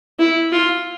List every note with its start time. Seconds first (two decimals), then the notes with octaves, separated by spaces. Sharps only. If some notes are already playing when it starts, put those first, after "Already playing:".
0.19 E4
0.52 F4